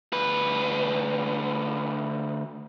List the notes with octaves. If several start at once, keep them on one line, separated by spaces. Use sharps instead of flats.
D2 B4